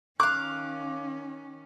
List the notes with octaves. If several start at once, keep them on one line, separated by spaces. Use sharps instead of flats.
D#3 C#4 F5 D6 F#6